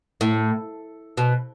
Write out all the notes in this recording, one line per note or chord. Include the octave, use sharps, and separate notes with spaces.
A2
B2